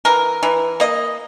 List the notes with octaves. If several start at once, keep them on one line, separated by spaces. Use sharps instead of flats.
E3 A#4
E3
A#3 D#5